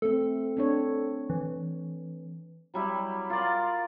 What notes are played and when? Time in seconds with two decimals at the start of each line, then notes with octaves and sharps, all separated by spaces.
0.02 A3 C4 A4
0.57 C4 D4 C#5
1.30 E3
2.74 F#3 G3 E4
3.30 F4 A#4 D5 C6